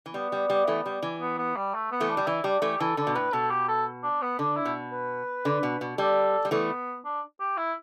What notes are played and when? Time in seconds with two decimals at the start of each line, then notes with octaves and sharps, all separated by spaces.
0.06 E3
0.14 G3 B3
0.32 G3
0.50 G3
0.67 E3 A3
0.86 G3
1.03 E3
1.20 B3
1.38 B3
1.56 G3
1.74 A3
1.91 B3
2.00 E3 A3
2.10 D4
2.17 G3
2.27 E3 E4
2.44 G3 D4
2.62 E3 A3 G4
2.80 E3 A4
2.97 D3 A4
3.07 B2
3.15 A2 B4
3.33 B2 A4
3.51 G4
3.68 A4
4.03 D4
4.22 B3
4.39 D3 D4
4.57 E4
4.65 B2
4.92 B4
5.45 D3
5.63 B2
5.81 B2
5.98 G3 A4
6.45 G3
6.51 E3 A3 B3
7.05 D4
7.40 G4
7.57 E4